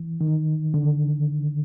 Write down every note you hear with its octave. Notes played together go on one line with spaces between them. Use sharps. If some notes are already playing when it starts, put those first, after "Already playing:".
Already playing: E3
D#3
D3